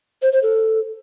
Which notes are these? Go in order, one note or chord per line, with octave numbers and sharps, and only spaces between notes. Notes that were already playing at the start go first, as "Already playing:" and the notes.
C5
C5
A4